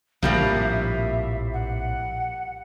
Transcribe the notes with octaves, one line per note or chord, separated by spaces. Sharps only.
A#1 A2 C3 F3 G3 A#3 E5
F#5